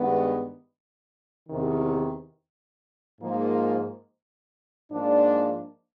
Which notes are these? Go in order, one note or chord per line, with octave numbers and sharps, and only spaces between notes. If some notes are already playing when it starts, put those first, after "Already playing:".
Already playing: G2 D#3 G#3 B3
E2 C3 D#3
G#2 F3 A#3
G#2 F3 A#3 D4